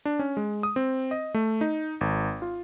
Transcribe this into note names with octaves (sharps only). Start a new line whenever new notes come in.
D4
C#4
G#3
D#6
C4
D#5
A3
D#4
G#1
F4